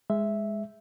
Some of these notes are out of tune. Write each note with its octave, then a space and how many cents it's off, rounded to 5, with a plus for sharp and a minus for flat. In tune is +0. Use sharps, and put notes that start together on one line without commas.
G#3 +0 E5 +0